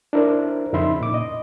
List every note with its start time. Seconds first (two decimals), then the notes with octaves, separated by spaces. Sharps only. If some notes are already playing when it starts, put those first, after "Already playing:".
0.13 D4 E4 A#4 C5 D5
0.73 F2 C#3 D#4 E5 B5 C6
1.01 A#2 D6
1.14 D#5